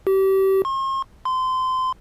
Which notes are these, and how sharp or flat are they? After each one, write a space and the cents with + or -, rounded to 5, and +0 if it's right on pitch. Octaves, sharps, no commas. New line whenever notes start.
G4 -30
C6 +45
C6 -25